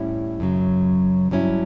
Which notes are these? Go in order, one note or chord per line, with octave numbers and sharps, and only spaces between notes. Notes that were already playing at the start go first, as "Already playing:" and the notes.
Already playing: A2 G3 C#4 E4
F#2 C#3 F#3
G2 F#3 C#4 E4